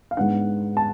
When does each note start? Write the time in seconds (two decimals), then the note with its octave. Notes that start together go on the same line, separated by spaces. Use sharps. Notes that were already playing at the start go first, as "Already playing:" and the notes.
0.11 F5
0.17 G#2 G#3 B3 D4 F#5
0.77 A5